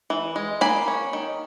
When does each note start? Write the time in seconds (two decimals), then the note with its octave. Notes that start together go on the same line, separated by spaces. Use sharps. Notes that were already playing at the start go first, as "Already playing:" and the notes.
0.10 E3
0.36 G#3
0.61 A#3 G#5 B5
0.88 C#4
1.13 D#3